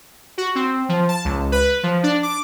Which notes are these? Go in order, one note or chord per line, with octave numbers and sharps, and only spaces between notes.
F#4
C4
F3
A5
C#2
B4
F3
D4
D6